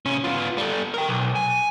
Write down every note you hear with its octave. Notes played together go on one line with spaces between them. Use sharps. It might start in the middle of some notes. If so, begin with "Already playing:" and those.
C3 C#4
B3 F4
G3 A4
A#4 G5
B1
G#5